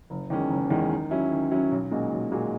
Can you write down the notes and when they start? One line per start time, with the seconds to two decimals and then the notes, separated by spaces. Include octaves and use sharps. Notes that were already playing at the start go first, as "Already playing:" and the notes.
0.10 F#1
0.30 E2 D#3 G#3 C#4
0.50 F#1
0.70 E2 D#3 G#3 C#4
0.91 D#3
1.11 F#3 C#4 E4
1.31 D#3
1.51 F#3 C#4 E4
1.71 B1
1.91 A#2 G#3 D#4 F#4
2.12 B1
2.32 A#2 G#3 D#4 F#4